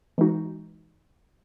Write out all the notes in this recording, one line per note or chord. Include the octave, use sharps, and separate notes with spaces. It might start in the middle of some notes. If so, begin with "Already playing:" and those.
E3 G#3 D#4 F#4